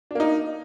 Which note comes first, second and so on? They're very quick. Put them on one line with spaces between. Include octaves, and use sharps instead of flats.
D4 A#3 D#4